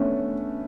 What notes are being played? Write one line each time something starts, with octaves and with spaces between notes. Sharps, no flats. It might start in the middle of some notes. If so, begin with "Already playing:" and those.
Already playing: A3 B3 C#4 D4